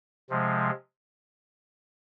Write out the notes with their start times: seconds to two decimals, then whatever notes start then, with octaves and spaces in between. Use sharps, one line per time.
0.30 C3 F3 G#3